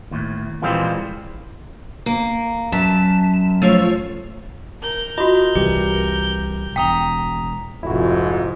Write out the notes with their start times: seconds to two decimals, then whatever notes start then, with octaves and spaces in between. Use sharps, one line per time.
0.11 D#2 A2
0.62 A#2 E3 G3 G#3 A#3 C4
2.06 A#3
2.72 F#2 A5 B6 E7
3.34 E7
3.62 F3 A3 F4 C#5
4.82 A#4 G6
5.18 F4 F#4 D#5
5.55 C2 E3 G3 G4
6.76 E1 G5 A#5 D#6 B6
7.83 F1 F2 G#2 E4 F#4